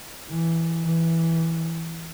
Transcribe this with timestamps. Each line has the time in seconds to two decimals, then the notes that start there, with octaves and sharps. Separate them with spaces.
0.29 E3
0.85 E3